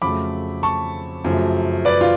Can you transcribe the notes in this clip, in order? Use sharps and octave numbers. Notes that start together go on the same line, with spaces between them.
F2 C#3 F#3 A3 B5 D6
A5 C#6
F#2 C#3 F3 A3
B4 D5
F4